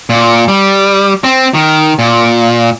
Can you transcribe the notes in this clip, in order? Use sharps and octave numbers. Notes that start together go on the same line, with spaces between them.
A#2
G3
C4
D#3
A#2